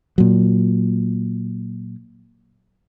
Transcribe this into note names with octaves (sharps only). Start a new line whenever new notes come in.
A#2 F#3